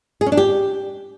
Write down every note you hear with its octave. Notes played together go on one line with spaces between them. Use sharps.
G#4
C#4
D4
G4